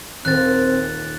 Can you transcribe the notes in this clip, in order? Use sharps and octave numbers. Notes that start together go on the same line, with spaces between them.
D#1 C4 A#4 F#6 A6